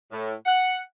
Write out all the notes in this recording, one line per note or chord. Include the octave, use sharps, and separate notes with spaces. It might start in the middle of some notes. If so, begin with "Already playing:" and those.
A2
F#5